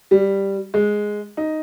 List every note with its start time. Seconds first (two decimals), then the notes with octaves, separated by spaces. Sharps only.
0.11 G3
0.74 G#3
1.37 D#4